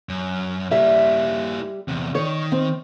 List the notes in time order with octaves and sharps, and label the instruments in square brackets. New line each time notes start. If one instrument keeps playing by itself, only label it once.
[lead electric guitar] F#2
[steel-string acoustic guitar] G3 E5 [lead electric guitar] A#3 E4
[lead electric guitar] E2 C3
[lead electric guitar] D#3 [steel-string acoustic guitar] C#5
[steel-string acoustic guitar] C4